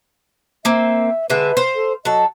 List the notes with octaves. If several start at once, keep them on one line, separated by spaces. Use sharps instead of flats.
A#3 C4 E5
D3 G#3 B4 E5
C5 F5
A4
F#3 A4 D#5